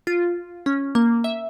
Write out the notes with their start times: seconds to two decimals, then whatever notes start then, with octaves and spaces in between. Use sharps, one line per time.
0.07 F4
0.66 C#4
0.95 A#3
1.24 E5